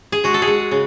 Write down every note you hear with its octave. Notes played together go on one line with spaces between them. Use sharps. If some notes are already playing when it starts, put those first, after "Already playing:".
G#4
G#3 F#4
A4
G#4
G#3
C#3